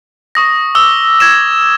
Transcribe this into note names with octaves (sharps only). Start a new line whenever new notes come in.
C#6 D#6 A#6
D6 E6 G7
G#6 A#6 E7